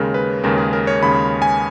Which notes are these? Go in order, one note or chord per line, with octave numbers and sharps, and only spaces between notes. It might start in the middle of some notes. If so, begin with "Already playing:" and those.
Already playing: D#2 C#3 G#3 A#4
B4
D#2 C#3 G#3 A#4
G#4
A#4
C#5
D#2 C#3 G#3 B5
G#5